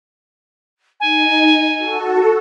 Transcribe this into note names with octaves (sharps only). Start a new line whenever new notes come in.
D#4 G#5
F#4 A4